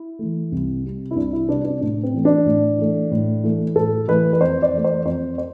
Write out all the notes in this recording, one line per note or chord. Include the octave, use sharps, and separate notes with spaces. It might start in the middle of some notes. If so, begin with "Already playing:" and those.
Already playing: E4
E3 A3
C2
C3 G3
E4
C2 D4
E4
C3 G3 D4
D4
A2 D4
C4
E3 A3
D4
A2
E3 A3
A2
E3 A3
A2 A4
E3 A3 B4
B4
F2 C5
D5
E3 A3
C5
F2 C5
C5